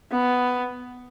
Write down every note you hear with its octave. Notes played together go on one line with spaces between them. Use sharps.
B3